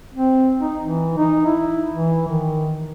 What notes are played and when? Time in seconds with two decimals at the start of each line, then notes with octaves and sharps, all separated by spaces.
0.14 C4
0.60 D#4
0.83 E3
1.17 D#4
1.46 E4
1.93 E3
2.28 D#3